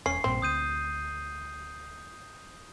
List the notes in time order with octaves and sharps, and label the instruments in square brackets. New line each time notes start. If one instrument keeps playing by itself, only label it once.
[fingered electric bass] E1 [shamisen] C#4 [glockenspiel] C7
[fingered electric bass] A#1 G2 A#2 [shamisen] C4
[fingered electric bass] D2 [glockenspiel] D#6 G6 D#7